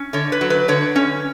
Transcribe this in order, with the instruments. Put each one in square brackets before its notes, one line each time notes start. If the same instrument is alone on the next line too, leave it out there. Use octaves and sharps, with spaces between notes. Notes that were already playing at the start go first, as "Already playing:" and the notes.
Already playing: [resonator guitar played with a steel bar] C#4
D3 C#5
B4
F#3
B4
D3 C#5
C#4